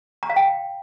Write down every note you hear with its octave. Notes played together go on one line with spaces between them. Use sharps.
A#5
F5
G5